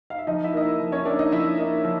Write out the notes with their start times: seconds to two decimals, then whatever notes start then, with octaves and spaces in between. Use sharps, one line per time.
0.10 F5
0.18 E5
0.27 F3 D#4 D#5
0.44 E4 E5
0.54 A#3 D#4 D#5
0.62 E4 E5
0.79 F3
0.92 C#4 C#5
1.06 A#3 D4 D#4 D5
1.19 D#4 D#5
1.32 F3 E4 E5
1.58 A#3 D#4
1.84 F3